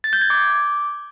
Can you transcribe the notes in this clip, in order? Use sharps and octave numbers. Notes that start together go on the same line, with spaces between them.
A6
G6
G#6
D6